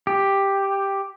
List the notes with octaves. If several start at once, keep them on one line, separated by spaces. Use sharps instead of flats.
G4